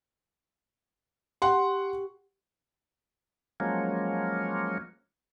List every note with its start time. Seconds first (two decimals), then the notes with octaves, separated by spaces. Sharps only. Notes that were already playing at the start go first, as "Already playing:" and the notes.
1.42 G4 F#5 C6
3.60 F3 F#3 G#3 A#3 C#4